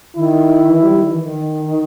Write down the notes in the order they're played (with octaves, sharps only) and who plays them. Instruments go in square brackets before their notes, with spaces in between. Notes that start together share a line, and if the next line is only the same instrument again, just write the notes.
[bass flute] D#3 [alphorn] E4
[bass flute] E3
G3
D#3
E3
D#3